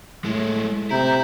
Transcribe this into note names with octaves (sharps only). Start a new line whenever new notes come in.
A2 G#3 A3
C3 E4 A#5 G6